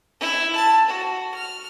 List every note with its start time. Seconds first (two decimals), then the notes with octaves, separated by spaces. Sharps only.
0.20 E4
0.55 A5
0.88 F#4
1.33 F6